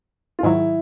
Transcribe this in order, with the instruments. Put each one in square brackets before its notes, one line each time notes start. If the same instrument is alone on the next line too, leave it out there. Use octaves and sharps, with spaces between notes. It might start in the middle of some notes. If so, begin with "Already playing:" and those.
[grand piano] F4
[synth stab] G#2 D#3 F#3 [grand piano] E4